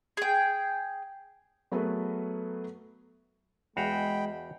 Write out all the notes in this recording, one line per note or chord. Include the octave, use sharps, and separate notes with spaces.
G#4 G5
F#3 A3 B3 G#4 A#4 B4
E2 G#3 F#4 F5 G5 B5